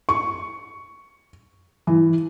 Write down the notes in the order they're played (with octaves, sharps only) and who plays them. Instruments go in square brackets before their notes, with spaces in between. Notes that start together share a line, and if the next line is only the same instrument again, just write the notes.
[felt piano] C#6
E3